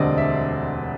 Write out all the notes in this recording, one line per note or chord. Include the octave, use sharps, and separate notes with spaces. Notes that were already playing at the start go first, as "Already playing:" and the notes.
Already playing: E1 D2 D3 G3 C4 D5 D#5
E5